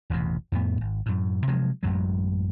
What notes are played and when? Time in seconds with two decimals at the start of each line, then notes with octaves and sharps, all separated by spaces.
0.10 E1 A1 E2 C3
0.52 F2 A2 B3
0.81 G#1
1.06 F#2 A2
1.47 C3 F3 F#3 G#3
1.83 A1 F#2 F#3 G#3